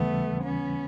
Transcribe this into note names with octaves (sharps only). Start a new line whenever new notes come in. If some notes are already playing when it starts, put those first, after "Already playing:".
Already playing: D#2 C#3 E3 G3 A3 B3
B3 C#4